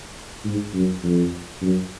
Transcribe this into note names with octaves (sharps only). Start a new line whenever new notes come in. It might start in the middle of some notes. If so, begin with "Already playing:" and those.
G#2
F#2
F2
F#2